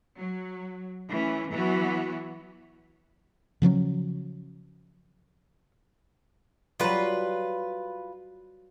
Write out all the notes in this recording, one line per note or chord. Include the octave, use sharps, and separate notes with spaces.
F#3
E3 A3 C#4
E3 F#3 B3 F#4
C#3 F3 F#3 C#4
F#3 G3 F4 B4